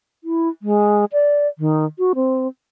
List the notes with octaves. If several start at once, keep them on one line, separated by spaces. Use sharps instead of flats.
E4
G#3
D5
D#3
F#4
C4